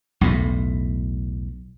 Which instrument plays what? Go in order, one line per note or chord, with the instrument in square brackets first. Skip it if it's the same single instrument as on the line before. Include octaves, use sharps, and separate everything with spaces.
[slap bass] B1 E2 A2